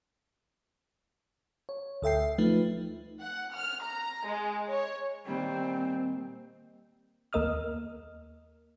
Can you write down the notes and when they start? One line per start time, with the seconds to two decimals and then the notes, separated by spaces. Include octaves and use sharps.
1.69 C#5
2.02 D2 A4 E5 G5 C7
2.38 F3 A3 D#4 B4
3.20 F#5
3.53 F6
3.82 A#5
4.25 G#3
4.69 C#5
5.27 A#2 D#3 G3 C4
7.33 D#2 A#3 A#4 D#5 D#6 F6